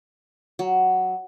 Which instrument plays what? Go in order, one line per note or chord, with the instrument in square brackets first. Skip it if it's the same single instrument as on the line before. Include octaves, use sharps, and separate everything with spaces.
[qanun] F#3